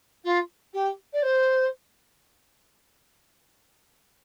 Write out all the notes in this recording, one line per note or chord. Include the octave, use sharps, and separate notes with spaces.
F4
G4
D5
C5